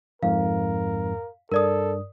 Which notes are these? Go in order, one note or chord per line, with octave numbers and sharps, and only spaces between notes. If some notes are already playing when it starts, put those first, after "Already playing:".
F2 G#2 A#4 F5
G2 A4 A#4 D5 D#6